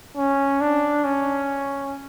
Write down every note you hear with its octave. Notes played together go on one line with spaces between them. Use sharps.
C#4
D4
C#4